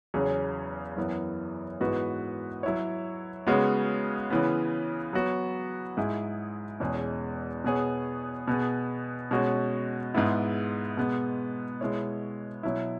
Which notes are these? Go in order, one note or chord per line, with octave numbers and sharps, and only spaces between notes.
E2 C#3 F#3 C#4 G#4
F#2 E3 B3
G#2 E3 B3 F#4 B4
F#3 E4 C#5
C#3 G#3 B3 F#4
C#3 E3 B3
F#3 B3 F#4
G#2 G#3 E4 G#4
E2 B2 G#3 C#4 G#4
B2 B3 G#4 C#5
B2 B3 G#4
B2 G#3 C#4 F#4
G#2 G#3 B3 E4
B2 G#3 B3
B2 G#3 B3 E4 C#5
B2 F#3 E4